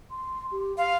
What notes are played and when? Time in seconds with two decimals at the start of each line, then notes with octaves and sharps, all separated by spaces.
0.11 C6
0.52 G4
0.78 F5 C6